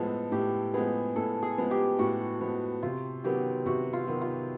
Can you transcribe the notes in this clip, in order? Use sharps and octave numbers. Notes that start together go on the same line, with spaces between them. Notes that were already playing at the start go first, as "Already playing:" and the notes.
Already playing: A2 F3 G#3 B3 A4
A2 G4
F3 G#3 B3 G#4
A2 A4
G#4
F3 G#3 B3
G4
A2 F#4
F3 G#3 B3
C3 F4
D#3 F#3 B3 G4
C3 F#4
F4
D#3 F#3 B3
F4